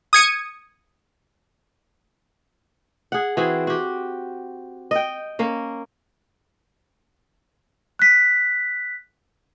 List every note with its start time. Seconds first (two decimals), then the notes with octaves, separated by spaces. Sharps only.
0.13 D#6 G#6 C#7 D#7
3.12 G#4 F#5
3.37 E3 C4 F#4 G#4
3.67 F#4 G4
4.91 D#5 G5
5.39 A#3 C#4
7.99 F#6 B6